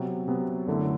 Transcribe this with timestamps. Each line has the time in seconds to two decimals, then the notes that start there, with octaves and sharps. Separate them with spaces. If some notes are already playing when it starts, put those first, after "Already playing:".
Already playing: C3 F#3 B3
0.28 C3 F#3 B3
0.67 F#2 D3 A3 E4